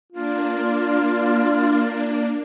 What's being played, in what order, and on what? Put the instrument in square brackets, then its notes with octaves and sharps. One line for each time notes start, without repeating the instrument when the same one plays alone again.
[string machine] A#3 D4 [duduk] F4